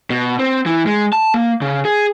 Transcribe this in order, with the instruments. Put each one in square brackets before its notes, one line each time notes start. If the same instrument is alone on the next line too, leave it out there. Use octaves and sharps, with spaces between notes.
[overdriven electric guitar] B2
C4
E3
G#3
A5
A#3
C#3
G#4